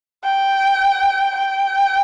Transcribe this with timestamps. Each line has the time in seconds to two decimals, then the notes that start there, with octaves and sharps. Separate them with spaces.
0.24 G5
1.36 G5